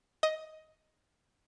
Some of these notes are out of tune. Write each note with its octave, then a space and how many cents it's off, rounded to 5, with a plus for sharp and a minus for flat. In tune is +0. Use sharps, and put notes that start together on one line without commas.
D#5 +10